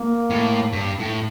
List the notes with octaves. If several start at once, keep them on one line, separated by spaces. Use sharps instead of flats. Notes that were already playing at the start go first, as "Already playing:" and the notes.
Already playing: A#3
A2
G2
A2